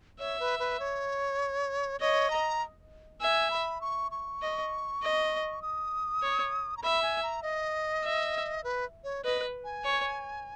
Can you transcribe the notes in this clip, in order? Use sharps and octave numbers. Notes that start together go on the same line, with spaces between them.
C#5 E5
B4
B4
C#5
C#5 D#5
A#5
E5 G#5
B5
C#6
C#6
D#5
D#5
D#6
C#5
A#5
E5 B5
G#5
A#5
D#5
E5
B4
C#5
B4 D#5
G#5
C#5